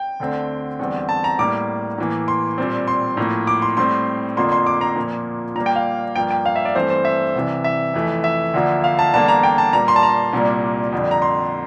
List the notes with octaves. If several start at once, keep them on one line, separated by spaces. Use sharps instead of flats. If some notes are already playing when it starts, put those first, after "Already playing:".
Already playing: G5
D2 D3 A3 C4
E2 D3 G3 C4
A5
A#5
A2 G3 A#3 D6
A2 E3 A#3
C6
A#2 G3 C4
C6
A2 F3 A#3
D6
C6
A2 G3 C4 C6
F2 D3 F3 A#3 C6
C6
D6
A#5
A#2 F3 A#3
A#2 G3 A#3 A#5
G5
F5
G2 F3 A#3 G5
G5
F5
E5
D5
G2 E3 A3 C4 C5
C5
E5
C2 C3 E3
E5
F2 E3 A3
E5
D2 D3 F3 A#3
F5
A5
E2 D3 G3 A#3 A5
A#5
G5
A5
A#2 G3 A#3 A#5
C6
A5
A#5
C2 A#2 G3 A#3
F2 D3 G3
A#5
C6